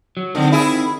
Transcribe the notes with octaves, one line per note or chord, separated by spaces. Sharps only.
F#3
D3 D#3 C4
E4 G#4